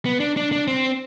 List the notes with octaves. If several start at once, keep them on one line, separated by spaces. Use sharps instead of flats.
B3
D4
D4
D4
C4